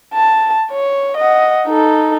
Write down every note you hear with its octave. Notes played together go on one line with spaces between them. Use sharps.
A5
C#5
D#5 F#5
D#4 A4